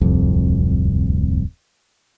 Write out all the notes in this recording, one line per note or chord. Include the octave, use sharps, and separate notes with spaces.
D1 C2 F2